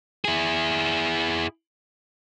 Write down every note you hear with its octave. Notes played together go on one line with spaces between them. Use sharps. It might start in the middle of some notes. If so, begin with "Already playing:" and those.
E4 G#4